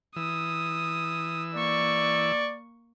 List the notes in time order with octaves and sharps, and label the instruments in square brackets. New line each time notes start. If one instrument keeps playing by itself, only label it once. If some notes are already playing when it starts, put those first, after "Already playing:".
[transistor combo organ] E3 E6 [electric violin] D#6
[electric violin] A#3 C#6 [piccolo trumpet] D5